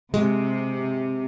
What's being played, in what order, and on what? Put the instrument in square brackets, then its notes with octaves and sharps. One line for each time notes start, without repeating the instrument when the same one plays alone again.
[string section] C3 [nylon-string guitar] G#3